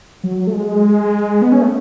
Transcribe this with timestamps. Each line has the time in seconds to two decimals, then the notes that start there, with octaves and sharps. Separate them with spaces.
0.24 F#3
0.47 A3
0.54 G#3
1.42 B3
1.52 C#4
1.62 A3